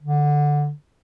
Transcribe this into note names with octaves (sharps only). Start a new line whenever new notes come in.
D3